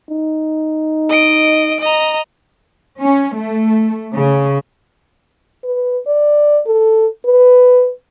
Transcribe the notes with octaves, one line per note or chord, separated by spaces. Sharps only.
D#4
D#5 D7
D#5 A#5
C#4
A3
C#3
B4
D5
A4
B4